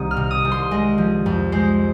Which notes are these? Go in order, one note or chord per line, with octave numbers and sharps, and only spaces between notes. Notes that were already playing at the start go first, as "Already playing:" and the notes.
Already playing: C2 D#3 C4 D#6
F6
C3
D#6
C2
C6
G#3 D#5
F3
F2
G#3 C5